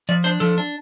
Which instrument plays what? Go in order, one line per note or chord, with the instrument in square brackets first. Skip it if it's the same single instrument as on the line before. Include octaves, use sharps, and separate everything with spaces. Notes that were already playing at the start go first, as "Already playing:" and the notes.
[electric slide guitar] F3 D5
D4 C5
F3 A4
D4